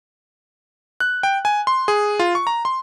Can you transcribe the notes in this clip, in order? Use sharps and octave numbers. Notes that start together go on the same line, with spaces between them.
F#6
G5
G#5
C6
G#4
F4
C#6
A#5
C6